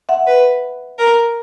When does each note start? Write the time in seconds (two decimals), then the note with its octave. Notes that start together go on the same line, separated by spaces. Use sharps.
0.09 E5 F#5
0.27 B4
0.98 A#4